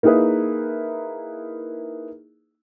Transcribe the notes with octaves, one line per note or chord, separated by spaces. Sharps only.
A#3 D#4 E4 G#4 B4